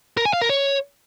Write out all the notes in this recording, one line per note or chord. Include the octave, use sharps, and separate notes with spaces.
A#4
G#5
F5
A#4
C#5